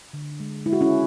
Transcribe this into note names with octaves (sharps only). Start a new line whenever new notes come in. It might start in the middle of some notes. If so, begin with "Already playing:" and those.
D3
G#3
G#3 E4
F#4
C#4 E4